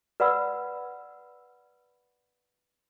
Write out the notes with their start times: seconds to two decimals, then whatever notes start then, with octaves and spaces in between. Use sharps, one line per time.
0.20 B4 D5 F#5 B5 E6